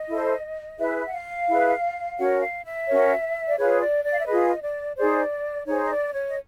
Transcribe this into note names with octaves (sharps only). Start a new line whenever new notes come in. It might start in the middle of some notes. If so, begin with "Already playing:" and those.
Already playing: D#5
E4 A4 C5
E4 G#4 B4 E5
F#5
F5
E4 G#4 B4
C#4 F#4 A#4 C#5 F#5
F5
E5
C#4 F#4 A#4 C#5
D5
F4 G#4 B4 C#5
D5
D5
F5
E5
F4 G#4 B4 D#5
D5
D#4 G#4 C5 D5
D#4 G#4 C5 C#5
D#5
D5
C#5
D#5